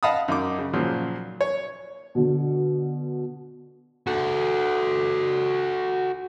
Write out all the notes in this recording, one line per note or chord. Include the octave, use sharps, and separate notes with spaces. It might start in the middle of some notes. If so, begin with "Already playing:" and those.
D#5 F5 F#5 A5 B5 D#6
F#2 D#4 D6
C#3
A#2 C#3 F3 F#3
C#5
B2 D3
F#4 A4